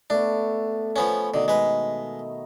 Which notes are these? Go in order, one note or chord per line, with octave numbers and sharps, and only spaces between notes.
A3 B3 D4
F3 B3 C#4
B2 D3 D#3 D#5
G#3 B4